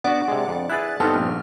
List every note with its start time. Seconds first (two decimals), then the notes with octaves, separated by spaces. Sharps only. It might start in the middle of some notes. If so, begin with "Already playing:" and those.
0.04 B3 D4 F#4 D5 F#5
0.28 C3 G#3
0.48 F2
0.69 E4 G#4 B4 F#6 A6
1.00 G2 B3 C4 D#4 A4 F6
1.16 A#1